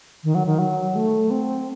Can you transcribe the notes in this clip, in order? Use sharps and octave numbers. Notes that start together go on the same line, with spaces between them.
D#3
F#3
D#3
F#3
A3
C4